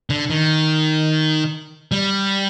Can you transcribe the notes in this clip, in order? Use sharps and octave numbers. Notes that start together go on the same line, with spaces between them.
D3
D#3
G3